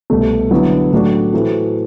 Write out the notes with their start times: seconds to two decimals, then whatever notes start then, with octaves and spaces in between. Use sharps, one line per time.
0.10 C2 B2 A3
0.51 D3 F#3 B3 E4
0.92 A2 F#3 A3 D4 F#4
1.33 A2 E3 A3 C4 F#4